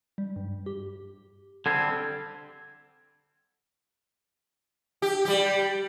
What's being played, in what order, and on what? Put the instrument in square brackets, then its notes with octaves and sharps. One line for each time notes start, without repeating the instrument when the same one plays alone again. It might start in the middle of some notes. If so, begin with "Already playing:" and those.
[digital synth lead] G3
G2
G4
[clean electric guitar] D3 G3 C4 [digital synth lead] A4 [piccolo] G#6
[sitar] G4
G3 G4